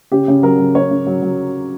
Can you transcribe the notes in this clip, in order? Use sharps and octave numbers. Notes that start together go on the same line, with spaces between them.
C#3 G4
C#3
F#3 A#4
F#3
C#3 C#5
C#3
F#3
F#3